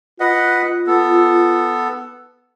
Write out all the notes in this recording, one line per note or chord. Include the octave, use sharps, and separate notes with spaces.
F4 B4 D#5 F#5
B3 A4